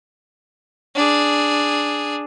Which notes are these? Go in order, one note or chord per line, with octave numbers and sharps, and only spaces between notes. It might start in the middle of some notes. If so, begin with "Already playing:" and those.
D4 G#4